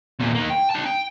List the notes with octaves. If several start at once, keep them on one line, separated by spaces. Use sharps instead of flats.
E2 A#2
D#3 A#3
G5
D#4 A5
G5